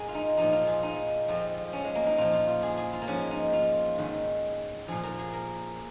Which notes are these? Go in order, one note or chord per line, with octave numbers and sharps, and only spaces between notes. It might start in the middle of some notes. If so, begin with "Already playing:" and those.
Already playing: G#2 G#4 A#4
F4
D#4
A#2 F3 D#4
F4
G#4
D#4
F2 F3
C#4
G#3
A#3
D#4
A#2 F3 F4
F4
F4
G#4
G#4
F4
A#3
G#2 F3 C#4
D#4
F4
G#2 D#3
A#2 F3 G#4
A#4
G#4
A#4